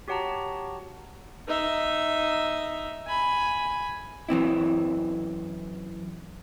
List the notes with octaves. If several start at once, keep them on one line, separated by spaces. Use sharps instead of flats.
F#4 G4 C#5 F#5 A5 A#5
D#4 E5
G#5 B5
F#2 E3 C4 E4